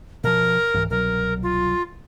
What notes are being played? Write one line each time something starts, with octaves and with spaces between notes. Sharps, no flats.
B2 F3 A#4
C2 G#2 E3
C2 B2 F#3 A#4
F4